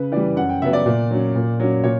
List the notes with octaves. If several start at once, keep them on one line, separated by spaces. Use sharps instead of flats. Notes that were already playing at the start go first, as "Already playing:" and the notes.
Already playing: C#3 B4
E3 G3 D5
F#2 F#5
G5
C#3 F#3 B3 E5
D5
A#2
F#3 C#4
A#2
F#3 C#4
A#2 C#5